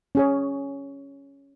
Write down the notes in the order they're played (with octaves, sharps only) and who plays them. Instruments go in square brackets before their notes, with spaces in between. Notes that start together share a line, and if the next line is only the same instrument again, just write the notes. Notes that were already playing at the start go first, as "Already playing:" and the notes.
[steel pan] C#4 G#4 C#5